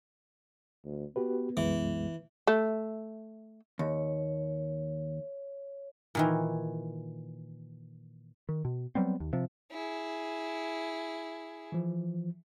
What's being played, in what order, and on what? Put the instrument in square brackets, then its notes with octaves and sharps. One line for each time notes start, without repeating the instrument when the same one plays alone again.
[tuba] D2
[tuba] B3 [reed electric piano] F#4 G4 B4
[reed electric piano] C2 F#2 G#3 [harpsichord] E3
[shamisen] A3
[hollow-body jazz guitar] D#2 [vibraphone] C#5
[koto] A#2 D#3 E3
[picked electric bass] D#3
B2
F#3 G3 B3 C4
D#2
C3 F3
[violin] E4 G#4
[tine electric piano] E3 F3